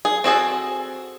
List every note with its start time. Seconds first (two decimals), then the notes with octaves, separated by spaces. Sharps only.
0.05 G#4
0.24 C4 F#4 G#4 A4